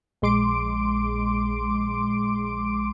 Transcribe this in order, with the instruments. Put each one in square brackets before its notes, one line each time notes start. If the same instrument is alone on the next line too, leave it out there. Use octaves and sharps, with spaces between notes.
[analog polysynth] A#1 G#3 C6 D6 D7